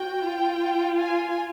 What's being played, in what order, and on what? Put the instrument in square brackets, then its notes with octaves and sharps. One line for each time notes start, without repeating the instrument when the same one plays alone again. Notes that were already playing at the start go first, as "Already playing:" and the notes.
Already playing: [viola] F#4 [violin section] G5
[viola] F4
[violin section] G#5